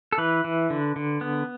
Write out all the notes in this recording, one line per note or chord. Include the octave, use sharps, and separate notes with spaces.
A4
E3 B4
E3
D3
D3
B3